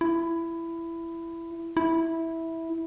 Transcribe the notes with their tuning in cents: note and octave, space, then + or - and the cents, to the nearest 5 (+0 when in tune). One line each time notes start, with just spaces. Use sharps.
E4 +15
E4 -10